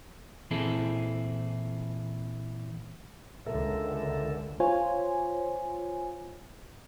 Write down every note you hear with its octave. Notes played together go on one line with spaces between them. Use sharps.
A#2 E3 C4 E4 G#4 A4
C#2 D3 A4 A#4 E5
F4 C5 C#5 G#5